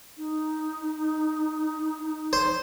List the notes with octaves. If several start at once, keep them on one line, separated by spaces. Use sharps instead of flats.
D#4
C5